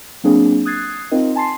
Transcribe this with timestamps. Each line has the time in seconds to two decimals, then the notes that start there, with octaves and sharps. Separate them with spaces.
0.24 F#3 A#3 C4 D4 G#4
0.65 D#6 F#6 G#6 A6 C7
1.11 C4 D#4 F4 A#4 D#5
1.36 G#5 A5 C6 C7